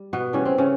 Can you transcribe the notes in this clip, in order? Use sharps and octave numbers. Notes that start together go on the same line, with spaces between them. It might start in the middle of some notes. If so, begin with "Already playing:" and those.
Already playing: G3
B2 B3
C#3 E3 G3 C#4
C4
C#3 C#4